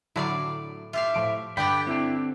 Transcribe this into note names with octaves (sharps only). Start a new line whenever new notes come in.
A2 D3 F#3 E4 D5 F5
F4 G4 E5 F5
A2 F3 D7
G2 D3 B3 G4 D5 G5 B5 G6
C4 D4 E4